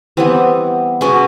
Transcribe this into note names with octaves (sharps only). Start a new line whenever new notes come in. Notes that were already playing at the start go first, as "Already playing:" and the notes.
E3 G3 B3 C4
B2 G#3 B3 C#4